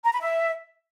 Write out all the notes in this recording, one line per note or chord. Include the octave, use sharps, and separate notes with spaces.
A#5
B5
E5